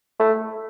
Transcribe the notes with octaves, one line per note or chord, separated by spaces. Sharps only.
A3